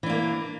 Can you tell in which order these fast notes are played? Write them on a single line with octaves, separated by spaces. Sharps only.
E3 D4 A#3